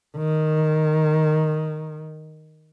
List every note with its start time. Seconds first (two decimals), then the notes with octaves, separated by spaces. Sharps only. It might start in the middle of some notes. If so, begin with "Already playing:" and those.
0.17 D#3